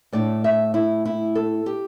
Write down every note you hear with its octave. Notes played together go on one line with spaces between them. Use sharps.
A2 A3 D4 D5
E5
E4
E4
A4
G4